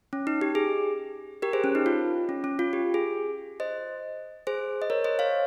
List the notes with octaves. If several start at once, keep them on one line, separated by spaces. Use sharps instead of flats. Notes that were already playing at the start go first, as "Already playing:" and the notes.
C#4
D#4
G4
G#4
G4 A#4
G#4 C5
C#4
D#4
F4
C#4
C#4
F4
G4
G#4
C5 D#5
G#4 C5
D#5
A#4 C#5
C5 D#5
C#5 F5